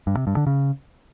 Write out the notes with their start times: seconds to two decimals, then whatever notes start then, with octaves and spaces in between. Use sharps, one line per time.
0.07 G2
0.17 C3
0.27 G2
0.37 D3
0.47 C#3